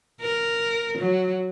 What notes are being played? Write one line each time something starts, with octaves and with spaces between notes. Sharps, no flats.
A#4
F#3